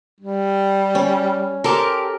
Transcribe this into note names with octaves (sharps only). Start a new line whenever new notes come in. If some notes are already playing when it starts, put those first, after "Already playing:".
G3
C#4
G4 A4 A#4 C5